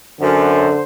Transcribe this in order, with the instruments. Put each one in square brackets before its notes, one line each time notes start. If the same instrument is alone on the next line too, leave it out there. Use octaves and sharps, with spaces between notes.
[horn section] F#2 [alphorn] D3 [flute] C5